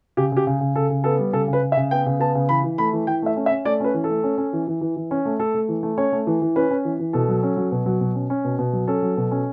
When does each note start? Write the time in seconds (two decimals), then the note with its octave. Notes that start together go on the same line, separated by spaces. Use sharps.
0.17 C#3 G4
0.32 C#3 G4
0.47 C#3
0.61 C#3
0.76 C#3 A4
0.90 C#3
1.04 B3 A4
1.19 G3
1.33 C#3 A4
1.48 C#3
1.53 B4
1.62 C#3
1.72 E5
1.77 C#3
1.91 B3 G5
2.06 C#3
2.20 B3 A5
2.35 C#3
2.49 E3 B5
2.64 E3
2.78 A3 B5
2.93 E3
3.07 E3 G5
3.22 A3 E5
3.36 C#4
3.46 E5
3.51 C#4
3.65 A3 D5
3.80 C#4 B4
3.94 E3
4.04 A4
4.10 A3
4.24 C#4
4.38 C#4
4.53 E3
4.68 E3
4.81 E3
4.96 E3
5.11 C#4
5.25 A3
5.39 A3 A4
5.54 A3
5.69 E3
5.83 A3
5.97 C#4 C#5
6.12 A3
6.27 E3
6.42 E3
6.56 C#4 B4
6.71 C#4
6.85 E3
6.99 E3
7.13 B2 A4
7.29 F#3
7.43 C#4
7.57 F#3
7.72 B2
7.86 F#3
8.01 B2
8.15 C#4
8.30 C#4
8.45 B2
8.59 B2
8.73 F#3
8.88 C#4 A4
9.03 F#3
9.17 B2
9.31 C#4